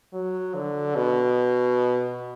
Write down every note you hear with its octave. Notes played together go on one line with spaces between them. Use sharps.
F#3
D3
B2